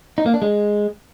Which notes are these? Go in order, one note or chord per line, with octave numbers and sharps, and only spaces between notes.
D#4
A#3
D4
G#3